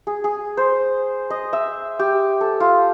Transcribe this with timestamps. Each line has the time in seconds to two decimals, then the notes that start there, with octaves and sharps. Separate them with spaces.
0.07 G#4
0.24 G#4
0.57 C5
1.30 D#5
1.53 E5
1.99 G4
2.41 A4
2.60 F4